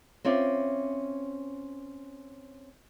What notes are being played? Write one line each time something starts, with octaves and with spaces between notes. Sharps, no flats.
C4 C#4 F4 D5 E5